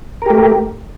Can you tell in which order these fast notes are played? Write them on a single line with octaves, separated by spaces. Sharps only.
A#4 G4 A3